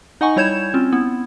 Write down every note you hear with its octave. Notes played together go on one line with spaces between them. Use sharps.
D#4 D#5 F#5 G#5 C#6
G3 E4 C#5 G6 G#6 E7
C4 C#4 F4
B3 E4